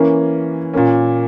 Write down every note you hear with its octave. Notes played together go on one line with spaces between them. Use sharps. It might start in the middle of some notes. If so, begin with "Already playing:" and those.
Already playing: E3 A#3 C#4
A#2 A#3 C#4